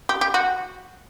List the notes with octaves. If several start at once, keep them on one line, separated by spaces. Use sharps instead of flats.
G4
G4
F#4